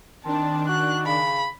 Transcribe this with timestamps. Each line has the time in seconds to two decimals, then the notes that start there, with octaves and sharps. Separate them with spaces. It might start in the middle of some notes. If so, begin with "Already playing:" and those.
0.25 D#3 C4 D4 A5
0.68 F#4 F#6
1.06 C#3 B5